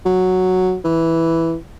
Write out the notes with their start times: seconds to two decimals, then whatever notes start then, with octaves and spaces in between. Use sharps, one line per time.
0.06 F#3
0.85 E3